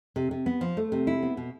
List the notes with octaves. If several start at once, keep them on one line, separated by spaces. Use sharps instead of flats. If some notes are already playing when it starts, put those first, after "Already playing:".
C3
C3
B3
F3
A3
C3
E4
B3
B2